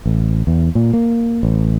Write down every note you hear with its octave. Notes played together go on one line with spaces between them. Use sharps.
A1
E2
A#2
A#3
A1